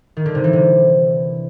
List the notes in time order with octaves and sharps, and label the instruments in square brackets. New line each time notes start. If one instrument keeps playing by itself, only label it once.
[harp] D#3
D3
C3
E3
C3